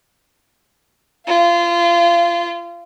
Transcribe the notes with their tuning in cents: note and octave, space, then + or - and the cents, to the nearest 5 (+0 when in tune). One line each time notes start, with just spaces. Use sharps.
F4 -25 F5 -30